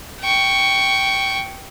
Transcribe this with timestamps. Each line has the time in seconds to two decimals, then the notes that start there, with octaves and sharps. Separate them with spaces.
0.20 G5 C#6